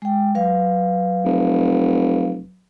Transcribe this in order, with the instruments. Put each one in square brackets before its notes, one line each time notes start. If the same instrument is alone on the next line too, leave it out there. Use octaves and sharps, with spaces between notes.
[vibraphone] G#3 G5
F#3 B4 F5
[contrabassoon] F1